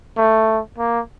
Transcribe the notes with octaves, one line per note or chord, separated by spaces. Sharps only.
A3
A#3